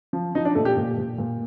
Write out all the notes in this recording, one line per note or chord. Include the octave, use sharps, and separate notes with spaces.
F3
F3 D#4
D4
A#2 A3
G4
A#2
A#2
A#2